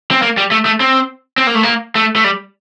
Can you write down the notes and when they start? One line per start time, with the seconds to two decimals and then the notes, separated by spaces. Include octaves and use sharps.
0.11 C4
0.22 A#3
0.37 G3
0.51 A3
0.65 A3
0.80 C4
1.38 C4
1.47 A#3
1.55 A3
1.63 A#3
1.95 A3
2.16 A3
2.24 G3